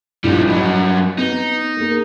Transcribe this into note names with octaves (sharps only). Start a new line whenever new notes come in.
A#1 A2 F3 G3 D#4
G2 F#3 D#5 B5
B3 D#4
A#3 G#4 A#4